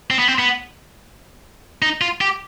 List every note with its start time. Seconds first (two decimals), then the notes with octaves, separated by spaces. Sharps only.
0.11 C4
0.19 B3
0.28 C4
0.39 B3
1.82 D#4
2.01 F4
2.21 G4